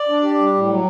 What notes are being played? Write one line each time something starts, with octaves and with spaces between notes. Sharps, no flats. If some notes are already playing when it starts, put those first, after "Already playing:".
Already playing: D5
D4
G4
G3
A2
F#3